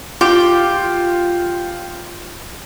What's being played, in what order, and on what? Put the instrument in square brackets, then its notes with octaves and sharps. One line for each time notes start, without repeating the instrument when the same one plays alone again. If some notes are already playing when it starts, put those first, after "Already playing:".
[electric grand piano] F4 [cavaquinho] G4 D6